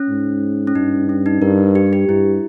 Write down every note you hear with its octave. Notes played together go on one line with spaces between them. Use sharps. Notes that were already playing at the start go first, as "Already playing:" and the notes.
Already playing: C#4
G#2
C#4
G2 D#4
C#4
D#4
G2 A#4
G4
G4
G2 E4